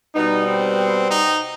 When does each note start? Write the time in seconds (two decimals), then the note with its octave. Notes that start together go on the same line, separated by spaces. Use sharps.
0.15 B2 G3 B3 D#4
0.47 C4
1.11 D#4